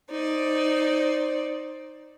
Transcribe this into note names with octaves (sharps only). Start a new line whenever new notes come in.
D#4 C5 D5